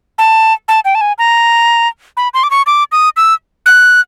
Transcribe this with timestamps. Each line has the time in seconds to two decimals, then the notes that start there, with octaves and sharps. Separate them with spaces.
0.18 A5
0.68 A5
0.85 G5
0.95 A5
1.01 G#5
1.18 A#5
2.17 B5
2.34 C6
2.43 D6
2.51 C#6
2.66 D6
2.92 D#6
3.17 E6
3.66 F#6